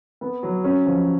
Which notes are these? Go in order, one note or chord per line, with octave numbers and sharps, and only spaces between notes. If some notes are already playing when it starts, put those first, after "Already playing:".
B3
F#3
C#4
F3